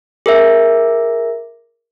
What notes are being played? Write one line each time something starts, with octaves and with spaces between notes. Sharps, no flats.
G#4 A#4 E5